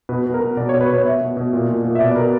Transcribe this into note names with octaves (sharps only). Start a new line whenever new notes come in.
B2 B4
B2
A#4
B2
B2 D5
C#5
B2
B4
B2 C#5
B2 E5
B2
B2
A#2
A#2
A#2
E5
B2 D5
B4
B2 A#4